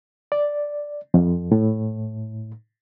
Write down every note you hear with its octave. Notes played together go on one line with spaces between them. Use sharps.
D5
F2
A2